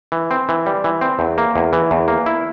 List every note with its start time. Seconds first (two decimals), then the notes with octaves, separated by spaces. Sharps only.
0.12 E3
0.31 C4
0.49 E3
0.66 G3
0.84 E3
1.01 C4
1.19 E2
1.38 A#3
1.56 E2
1.73 E3
1.91 E2
2.08 A#3
2.26 E4